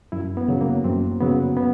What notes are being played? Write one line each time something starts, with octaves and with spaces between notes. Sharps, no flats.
F#2 E4
B3
C#3 F#3
A#3
F#2 C4
C#3 F#3 B3
B3